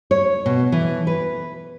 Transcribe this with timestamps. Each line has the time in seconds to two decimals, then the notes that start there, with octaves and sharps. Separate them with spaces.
0.11 C#5
0.46 B2
0.72 E3
1.07 B4